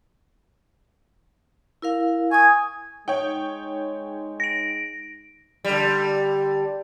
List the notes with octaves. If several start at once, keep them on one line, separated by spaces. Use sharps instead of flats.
E4 A#4 F5
G#5 C#6 D#6
G#3 D#4 C#5 G5
A#6 D7
D3 G3